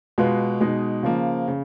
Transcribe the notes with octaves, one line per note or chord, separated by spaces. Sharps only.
B2 G#3 B3 F4
B2 G#3 D#4
C#3 F3 A#3
C#3